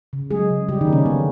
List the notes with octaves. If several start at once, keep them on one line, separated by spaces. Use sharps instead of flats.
C#3
F#3 G#3 G#4
C#3
C#3 G3 G4
D#3 D#4
A#3
C#3 C#4
D3 B3